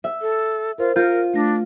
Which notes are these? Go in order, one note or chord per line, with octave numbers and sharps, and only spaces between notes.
E5
A4
F4 A#4 C5
F4 A#4 G6
A3 D4 A#6